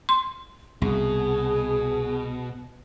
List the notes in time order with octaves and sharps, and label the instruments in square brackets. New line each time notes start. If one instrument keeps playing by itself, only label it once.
[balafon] C6
[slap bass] C2 [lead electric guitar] B2 [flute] G#4